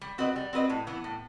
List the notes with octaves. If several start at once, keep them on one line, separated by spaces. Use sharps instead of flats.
G3
C4 F#4 B4 D#5
G3
C4 F#4 B4 D#5
A2
E3 B3 E4
A2